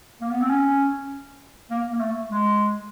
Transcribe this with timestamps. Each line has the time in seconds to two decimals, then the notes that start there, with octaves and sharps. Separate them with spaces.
0.21 A#3
0.31 B3
0.41 C4
0.50 C#4
1.71 A#3
1.93 A#3
2.00 A3
2.31 G#3